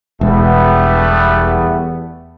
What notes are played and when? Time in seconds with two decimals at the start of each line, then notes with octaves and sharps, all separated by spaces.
0.21 E1 E2 G3 A3 B3